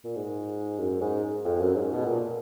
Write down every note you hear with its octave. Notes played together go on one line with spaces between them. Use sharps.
A#2
G#2
F#2
G#2
F2
F#2
G#2
B2
A#2